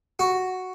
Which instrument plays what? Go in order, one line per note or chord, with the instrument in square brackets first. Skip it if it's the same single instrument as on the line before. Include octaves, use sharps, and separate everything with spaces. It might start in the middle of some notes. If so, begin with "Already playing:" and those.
[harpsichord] F#4